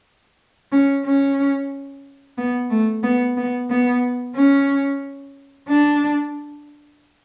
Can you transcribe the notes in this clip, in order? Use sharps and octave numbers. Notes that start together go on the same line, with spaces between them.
C#4
C#4
B3
A3
B3
B3
B3
C#4
D4